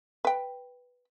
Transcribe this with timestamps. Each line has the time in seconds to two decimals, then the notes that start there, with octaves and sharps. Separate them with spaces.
0.25 B4 G5